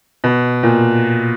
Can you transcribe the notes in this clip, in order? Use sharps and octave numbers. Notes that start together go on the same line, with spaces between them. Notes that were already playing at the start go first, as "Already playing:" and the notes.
B2
A#2